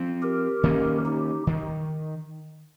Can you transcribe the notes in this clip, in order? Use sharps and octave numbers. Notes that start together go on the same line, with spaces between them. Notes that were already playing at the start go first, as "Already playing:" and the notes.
Already playing: F3 C4
G4 A#4
D#3 A#3 C#4
D#4 G4
D#3